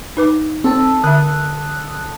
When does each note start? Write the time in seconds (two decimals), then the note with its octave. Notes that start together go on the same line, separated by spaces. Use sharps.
0.17 D#4 B4 D6
0.64 C4 A4 A5
1.04 D3 E5 D#6 F#6